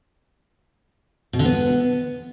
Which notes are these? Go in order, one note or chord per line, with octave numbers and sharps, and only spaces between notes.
B2
D3
B3